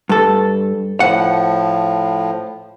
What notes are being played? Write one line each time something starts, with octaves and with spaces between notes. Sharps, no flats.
G2 A4
A2 F3 F#5